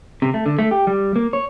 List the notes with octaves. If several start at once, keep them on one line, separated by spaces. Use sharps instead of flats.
C3
A3
D3
A3
G4
G3
A#3
C#5